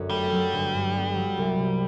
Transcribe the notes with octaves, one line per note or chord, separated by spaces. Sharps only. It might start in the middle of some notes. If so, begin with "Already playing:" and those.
Already playing: G1 F#2 B3
G3 A3
F#3
G1
G2
B3
F#3
C2
C3